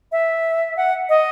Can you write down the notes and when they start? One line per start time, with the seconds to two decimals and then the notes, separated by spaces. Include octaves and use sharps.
0.12 E5
0.77 F#5
1.09 D#5